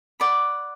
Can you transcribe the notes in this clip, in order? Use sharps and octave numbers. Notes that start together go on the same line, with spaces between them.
D5 F#5 B5